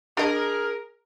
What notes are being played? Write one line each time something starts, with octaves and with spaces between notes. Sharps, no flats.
D4 G#4 A#4 D#5